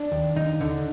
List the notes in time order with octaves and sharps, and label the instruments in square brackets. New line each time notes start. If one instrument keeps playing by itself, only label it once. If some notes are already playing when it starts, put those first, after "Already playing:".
Already playing: [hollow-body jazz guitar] D4
D#2
D#2 D#4
D3